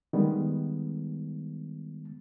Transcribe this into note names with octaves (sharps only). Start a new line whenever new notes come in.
D#3 G3 G#3 B3